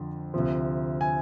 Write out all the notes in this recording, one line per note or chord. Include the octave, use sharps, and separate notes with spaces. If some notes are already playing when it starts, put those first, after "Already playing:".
Already playing: F2 D3 F3
D2 C3 F3
G#5